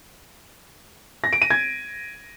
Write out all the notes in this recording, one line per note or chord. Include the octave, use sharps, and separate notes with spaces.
A#6
D7
D#7
G#6